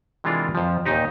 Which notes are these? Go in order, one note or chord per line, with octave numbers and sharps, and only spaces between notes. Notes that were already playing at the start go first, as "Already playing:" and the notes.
C3 E3 G#3 D4 F4 A#4
F2 F3
D#2 A#2 D#3 D#4 G4